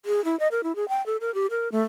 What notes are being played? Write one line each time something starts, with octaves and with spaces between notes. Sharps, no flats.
G#4
E4
D#5
A#4
E4
G#4
G5
A4
A#4
G4
A#4
A3